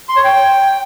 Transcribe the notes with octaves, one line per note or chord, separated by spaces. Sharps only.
C6
C#5
G5